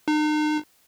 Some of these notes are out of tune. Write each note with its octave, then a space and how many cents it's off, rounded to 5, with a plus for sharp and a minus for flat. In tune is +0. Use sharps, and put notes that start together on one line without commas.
D#4 -40